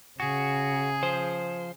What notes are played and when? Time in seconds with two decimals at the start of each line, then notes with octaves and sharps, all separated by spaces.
0.20 C#3 F#4 G#4
1.03 F3 C5